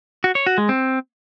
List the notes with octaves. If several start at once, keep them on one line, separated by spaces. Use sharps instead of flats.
F#4
C#5
F#4
G#3
C4